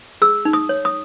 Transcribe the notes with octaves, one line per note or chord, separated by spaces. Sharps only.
G#4 E6
D#4
D#6
C#5
D#6